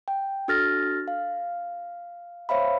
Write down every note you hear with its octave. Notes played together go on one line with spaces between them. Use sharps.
G5
D4 F#4 A4 F6 A6 A#6
F5
C5 C#5 E5 F5 B5